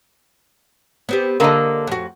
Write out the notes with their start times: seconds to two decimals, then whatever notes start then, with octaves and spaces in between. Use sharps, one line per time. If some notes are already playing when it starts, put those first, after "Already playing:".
1.09 B3 C4 G4
1.40 D3 A#3 A#4 D#5 A5
1.87 F2 F#4